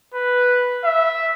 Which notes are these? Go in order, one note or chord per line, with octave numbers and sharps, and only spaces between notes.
B4
E5